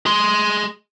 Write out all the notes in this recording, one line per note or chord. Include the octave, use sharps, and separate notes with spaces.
G#4 C6